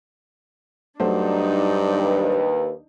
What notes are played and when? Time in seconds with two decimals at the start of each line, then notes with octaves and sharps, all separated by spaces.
1.00 G2 F#3 A3 D4 D#4 C5
1.90 D#2 B4